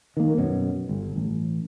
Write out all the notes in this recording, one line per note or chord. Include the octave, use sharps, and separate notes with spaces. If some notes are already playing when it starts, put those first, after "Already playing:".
D#3 A#3
F#2 B2 F#3
G1
A1